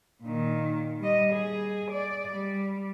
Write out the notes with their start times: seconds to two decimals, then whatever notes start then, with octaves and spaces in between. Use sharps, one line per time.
0.23 A#2 D#3
1.00 G3 D#5
1.33 G#4
1.91 D5
2.31 G3